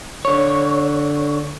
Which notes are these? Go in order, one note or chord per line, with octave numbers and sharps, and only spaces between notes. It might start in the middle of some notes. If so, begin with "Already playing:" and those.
D3 C#5